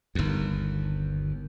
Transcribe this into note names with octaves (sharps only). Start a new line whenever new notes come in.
G1 D#2